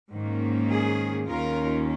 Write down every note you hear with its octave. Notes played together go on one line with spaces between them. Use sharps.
G#2 D#3 A#3 C#4
G#4
D#2 D#3 C#4 F4 A#4